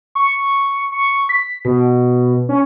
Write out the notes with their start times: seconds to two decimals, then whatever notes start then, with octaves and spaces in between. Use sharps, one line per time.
0.15 C#6
0.92 C#6
1.29 B6
1.65 B2
2.49 C#4